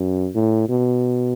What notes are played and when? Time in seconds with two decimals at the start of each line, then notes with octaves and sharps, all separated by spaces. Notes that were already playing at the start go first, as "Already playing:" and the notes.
Already playing: F#2
0.35 A2
0.69 B2